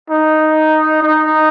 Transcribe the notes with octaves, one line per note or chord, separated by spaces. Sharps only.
D#4
D#4